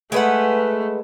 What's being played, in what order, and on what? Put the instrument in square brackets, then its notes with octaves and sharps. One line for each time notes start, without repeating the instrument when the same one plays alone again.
[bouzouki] G#3 B4 F#5 [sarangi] A3